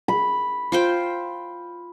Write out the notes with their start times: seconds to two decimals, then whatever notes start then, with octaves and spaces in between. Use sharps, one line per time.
0.08 B5
0.72 F4 C5 G5